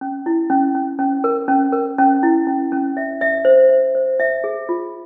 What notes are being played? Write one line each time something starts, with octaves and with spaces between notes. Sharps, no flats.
C#4
E4
C#4
C#4
C#4
A#4
C#4
A#4
C#4
E4
C#4
C#4
E5
E5
C5
E5
C5
E5
G#4
F4